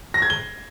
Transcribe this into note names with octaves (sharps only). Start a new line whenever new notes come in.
A#6
G#6
G7